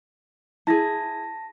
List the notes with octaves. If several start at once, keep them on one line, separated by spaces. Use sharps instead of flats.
E4 G#4 A5 A#6